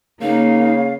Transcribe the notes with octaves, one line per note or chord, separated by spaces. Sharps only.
C#3 A#3 D#4 F5